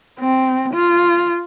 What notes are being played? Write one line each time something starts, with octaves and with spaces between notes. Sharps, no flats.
C4
F4